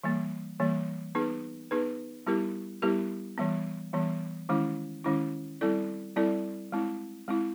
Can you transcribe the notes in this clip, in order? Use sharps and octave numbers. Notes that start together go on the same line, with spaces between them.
E3 G3 A#3
E3 G3 A#3
B3 D#4 G#4 B4
B3 D#4 G#4 B4
G3 B3 E4 G4 A#4
G3 B3 E4 G4 A#4
E3 G3 B3
E3 G3 B3
D#3 G#3 C#4 E4
D#3 G#3 C#4 E4
G3 C4 E4 A4 D5
G3 C4 E4 A4 D5
G#3 C4 E4
G#3 C4 E4